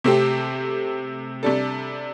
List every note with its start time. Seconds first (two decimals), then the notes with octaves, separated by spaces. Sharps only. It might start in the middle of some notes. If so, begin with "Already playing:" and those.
0.04 C3 A3 C4 G4
1.43 C3 G3 D4 A4